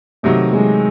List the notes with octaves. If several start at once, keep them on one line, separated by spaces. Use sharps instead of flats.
C3 D#3 F#3 A3
G#3